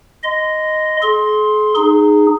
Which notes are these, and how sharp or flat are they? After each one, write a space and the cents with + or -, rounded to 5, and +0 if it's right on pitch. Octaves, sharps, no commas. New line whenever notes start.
D#5 +0 C6 -25
G#4 +45 C6 +5
D#4 -20 G#4 +0